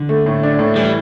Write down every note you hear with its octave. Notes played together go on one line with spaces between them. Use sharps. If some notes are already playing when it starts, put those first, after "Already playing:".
Already playing: D3
A3
A2
D4
A2
E3 G3